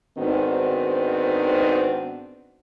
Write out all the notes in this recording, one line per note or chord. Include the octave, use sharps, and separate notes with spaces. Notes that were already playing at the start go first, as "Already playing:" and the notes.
G#2 D#3 B3 C4 D4 F#4